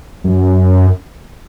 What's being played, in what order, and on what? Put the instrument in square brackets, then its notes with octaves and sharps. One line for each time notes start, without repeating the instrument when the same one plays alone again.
[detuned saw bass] F#2